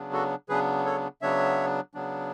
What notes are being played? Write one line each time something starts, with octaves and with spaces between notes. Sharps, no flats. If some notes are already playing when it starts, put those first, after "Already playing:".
Already playing: C#3 F#3 B3 D4
F#4 A4
C#3 F#3 B3 D4 G#4 B4
A4 C#5
C#3 F#3 B3 D4 C#5 E5
C#3 F#3 B3 D4